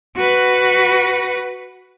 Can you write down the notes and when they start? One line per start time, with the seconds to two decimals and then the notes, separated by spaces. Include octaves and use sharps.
0.17 F#4 B4